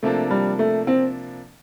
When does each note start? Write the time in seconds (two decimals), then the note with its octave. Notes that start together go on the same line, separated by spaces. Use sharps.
0.03 C3 F3 A3 A#3 D4
0.30 G3
0.59 A3
0.87 C4